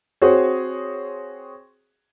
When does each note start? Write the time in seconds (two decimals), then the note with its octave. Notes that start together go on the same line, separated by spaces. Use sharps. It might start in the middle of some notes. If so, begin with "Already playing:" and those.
0.22 C4 F#4 G#4 C5 C#5